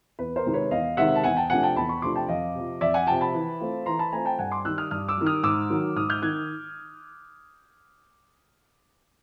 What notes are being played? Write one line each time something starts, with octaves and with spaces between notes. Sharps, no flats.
E2 B4
A#4 C5
C3 D#3 G#3
B4 C#5
E2 D#5 F5
C3 D#3 G#3 E5 F#5
A5
E2 F#5 G#5
G5 A5
C3 F3 A3 D4 F#5 G#5
G5 A5
E2 A5 B5
B5 C#6
C3 F3 A3 D4 C6 D6
G5 A5
F2 D#5 F5
C3 F3
F2 D5 E5
F#5 G#5
C3 F3 G5 A5
A5 B5
E3
A3 C4 F4
E3 A#5 C6
A5 B5
A3 C4 F4 G#5 A#5
G5 A5
G2 F#5 G#5
C6 D6
D#3 G3 E6 F#6
D#6 F6
G2 D#6 F6
D6 E6
D#3 G3
D#6 F6
G#2 D6 E6
D#3 F#3
G#2 D#6 F6
F6 G6
D#3 F#6 G#6